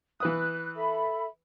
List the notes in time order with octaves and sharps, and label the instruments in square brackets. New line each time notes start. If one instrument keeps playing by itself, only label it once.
[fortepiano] E3 B4 D#6 [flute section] F#6
[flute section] A4 E5 B5